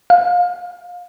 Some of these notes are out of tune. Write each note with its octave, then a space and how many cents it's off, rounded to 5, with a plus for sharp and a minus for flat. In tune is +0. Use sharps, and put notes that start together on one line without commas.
F5 +25